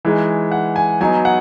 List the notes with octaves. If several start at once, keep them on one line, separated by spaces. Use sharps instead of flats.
E3 G#3 D#4
F#5
G#5
F#3 B3 D#4 G#5
F#5